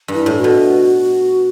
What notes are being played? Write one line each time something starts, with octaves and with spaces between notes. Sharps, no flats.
G2
E4
A2
F#4
B2